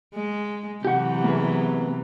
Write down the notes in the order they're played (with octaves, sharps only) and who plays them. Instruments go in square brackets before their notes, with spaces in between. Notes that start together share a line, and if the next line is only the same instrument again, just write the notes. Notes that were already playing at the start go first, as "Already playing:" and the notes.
[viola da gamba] G#3
[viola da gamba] C3 E3 F#3 [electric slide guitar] G4 F#5
[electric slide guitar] A#3 B3 G#4